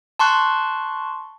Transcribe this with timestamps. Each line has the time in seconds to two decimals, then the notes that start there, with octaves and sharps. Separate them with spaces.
0.19 A5 C6 C#6 F#6